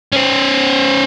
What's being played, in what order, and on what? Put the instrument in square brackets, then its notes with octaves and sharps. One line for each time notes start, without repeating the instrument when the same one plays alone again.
[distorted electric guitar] C#4 C5